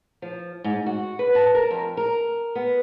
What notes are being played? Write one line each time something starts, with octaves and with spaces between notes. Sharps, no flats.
F3
G#2
F#4
B4
A5
A#4
F2
A#4
B3